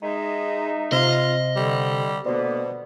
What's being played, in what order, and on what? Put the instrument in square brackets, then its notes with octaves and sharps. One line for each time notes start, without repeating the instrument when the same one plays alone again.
[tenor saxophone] G#3 [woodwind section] D#4 E5
[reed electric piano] C3 C5 [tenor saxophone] F4 [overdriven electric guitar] D#5
[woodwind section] D3 [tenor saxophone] G3
[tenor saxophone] B2 [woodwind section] D3 A#3 B3 [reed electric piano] C5 D5